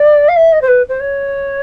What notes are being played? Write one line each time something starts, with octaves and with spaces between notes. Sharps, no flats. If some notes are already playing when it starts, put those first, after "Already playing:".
Already playing: D5
F5
E5
D#5
C5
B4
C5
C#5